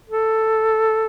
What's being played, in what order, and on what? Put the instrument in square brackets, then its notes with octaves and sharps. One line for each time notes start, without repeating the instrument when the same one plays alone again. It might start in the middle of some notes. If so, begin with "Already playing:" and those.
[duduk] A4